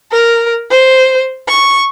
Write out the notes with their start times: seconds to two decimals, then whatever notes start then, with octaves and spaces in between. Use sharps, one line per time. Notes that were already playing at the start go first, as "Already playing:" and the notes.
0.12 A#4
0.71 C5
1.49 C#6